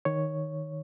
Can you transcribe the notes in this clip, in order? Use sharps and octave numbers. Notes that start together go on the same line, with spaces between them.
D#3 C#5